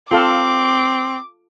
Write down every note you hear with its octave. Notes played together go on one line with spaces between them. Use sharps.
C4 F4 A4 F5 D6